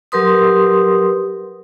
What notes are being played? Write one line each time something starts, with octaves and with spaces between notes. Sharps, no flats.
F#3 G4 A#4 B4 C6 D#6